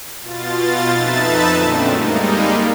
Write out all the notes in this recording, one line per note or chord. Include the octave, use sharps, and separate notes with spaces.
B2 F4 A6
F2 D#4 B4 E5 A5 A6
F#2 A#2 D3 A3 C4
G3 G#3 A#3 D#4